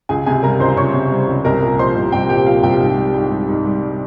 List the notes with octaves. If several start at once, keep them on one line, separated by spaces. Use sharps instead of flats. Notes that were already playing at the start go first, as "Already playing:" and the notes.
C#2 G#4 G#5
C3 G#4 G#5
G3 A#4 A#5
C#2 C5 C6
C#2 C#5 C#6
C3
G3
C#2
C2 A#4 A#5
A#2
F3 C5 C6
C2
C2 G4 G5
A#2 G4 G5
F3 F5
C2 G4 G5
G#2
G3
G#2
G3
G#2
G3